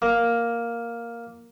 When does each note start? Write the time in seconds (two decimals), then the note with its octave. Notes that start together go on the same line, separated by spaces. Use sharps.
0.02 A#3